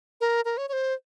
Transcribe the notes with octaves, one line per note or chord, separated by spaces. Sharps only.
A#4
A#4
C#5
C#5
C5